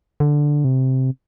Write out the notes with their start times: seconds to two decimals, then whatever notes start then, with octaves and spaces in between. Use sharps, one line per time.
0.20 D3
0.64 C3